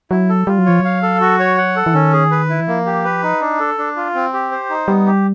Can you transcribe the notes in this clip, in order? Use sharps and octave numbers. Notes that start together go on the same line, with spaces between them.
F#3 E4
A4
G3 F4
F#3
F3 C#5
F#3 F5
A4
F#4
C#5
F#5
A4
E3
D#3 C#4
G#4
B4
E4
E3
F3 A#3
G4
B4
D#4
D4
A4
D4
F4
C4
G4
C5
D#4
G3 B3
G4